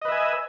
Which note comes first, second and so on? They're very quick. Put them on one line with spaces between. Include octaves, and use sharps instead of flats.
D#5 B4 E5 G#5